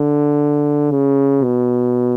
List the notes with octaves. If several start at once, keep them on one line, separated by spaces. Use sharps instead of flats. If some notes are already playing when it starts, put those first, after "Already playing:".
Already playing: D3
C#3
B2